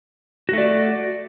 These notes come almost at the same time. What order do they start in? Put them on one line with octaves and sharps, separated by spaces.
F#4 A3 D5